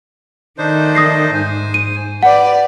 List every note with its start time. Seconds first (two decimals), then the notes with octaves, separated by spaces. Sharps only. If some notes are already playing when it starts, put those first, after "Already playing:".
0.58 D#3 A3 D4 D#4 C5
0.95 D#6 A#6 C7
1.34 G#2 C5 G#5
1.74 D#7
2.23 G4 B4 D5 F#5